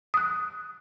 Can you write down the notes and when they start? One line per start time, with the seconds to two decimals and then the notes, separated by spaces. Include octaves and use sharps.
0.14 D#6 F#6